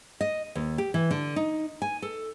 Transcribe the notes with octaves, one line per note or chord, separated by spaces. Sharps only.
D#5
D#2
G4
E3
D3
D#4
G#5
A4